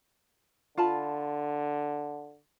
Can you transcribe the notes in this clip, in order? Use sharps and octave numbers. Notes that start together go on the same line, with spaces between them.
D3 F4 A5 B5